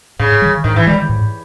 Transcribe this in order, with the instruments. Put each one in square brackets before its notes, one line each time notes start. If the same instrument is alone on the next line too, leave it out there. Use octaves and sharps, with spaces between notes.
[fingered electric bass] G#2 [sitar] C#3
[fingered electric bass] D#3 G3
[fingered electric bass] G#2 [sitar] D#3
[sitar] E3
[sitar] G3 [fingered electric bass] G#3
[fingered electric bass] D#3
G#2